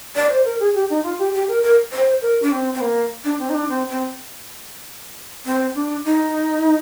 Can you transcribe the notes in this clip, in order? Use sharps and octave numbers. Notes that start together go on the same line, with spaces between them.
D5
C5
A#4
G#4
G4
D#4
F4
G4
G4
A#4
A#4
C5
A#4
D4
C4
C4
A#3
D4
C4
D#4
D4
C4
C4
C4
D4
D#4